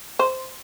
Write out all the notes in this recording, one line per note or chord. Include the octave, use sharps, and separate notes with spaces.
C5